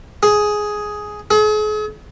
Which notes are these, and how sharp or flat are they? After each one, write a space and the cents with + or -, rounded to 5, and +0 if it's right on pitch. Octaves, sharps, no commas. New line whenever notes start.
G#4 +5
G#4 +40